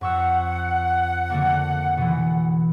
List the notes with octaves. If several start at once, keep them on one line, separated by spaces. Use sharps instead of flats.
F2 F#5 C#6 E6
D3 A3 A#3
B2 E3